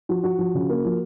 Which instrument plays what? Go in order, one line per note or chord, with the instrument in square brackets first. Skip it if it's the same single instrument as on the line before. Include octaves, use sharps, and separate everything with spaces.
[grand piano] F3 F#4
F3 F#4
F3
C#3
A#3
F3